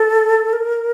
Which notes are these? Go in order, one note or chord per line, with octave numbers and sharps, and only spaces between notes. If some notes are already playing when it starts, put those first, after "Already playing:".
Already playing: A4
A#4